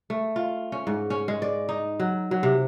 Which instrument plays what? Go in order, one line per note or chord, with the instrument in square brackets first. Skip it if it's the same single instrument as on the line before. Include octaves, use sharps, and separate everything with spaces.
[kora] A3
F4
C#4
G#2
C#4
G#3
D5
D#4
F#3
F#3
C3